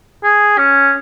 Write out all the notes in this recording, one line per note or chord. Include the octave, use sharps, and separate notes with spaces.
G#4
C#4